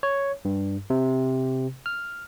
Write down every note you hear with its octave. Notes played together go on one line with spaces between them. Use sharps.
C#5
G2
C3
F6